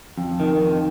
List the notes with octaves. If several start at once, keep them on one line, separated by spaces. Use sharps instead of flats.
F2
D#3
F2